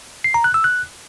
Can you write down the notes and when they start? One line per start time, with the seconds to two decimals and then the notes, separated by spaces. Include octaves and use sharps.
0.24 C7
0.34 A#5
0.44 F#6
0.54 E6
0.64 F#6